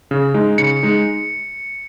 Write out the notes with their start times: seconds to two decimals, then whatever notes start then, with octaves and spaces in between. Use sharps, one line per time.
0.11 C#3
0.34 G#3 D#4
0.58 C#3 C#7
0.83 G#3 D#4